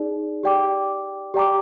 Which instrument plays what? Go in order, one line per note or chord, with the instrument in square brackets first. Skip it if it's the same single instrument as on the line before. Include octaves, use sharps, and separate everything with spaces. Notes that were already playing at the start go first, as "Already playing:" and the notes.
Already playing: [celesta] D#4 G#4 D5
G4 D5 G5 D6
G4 D5 G5 A#5 D6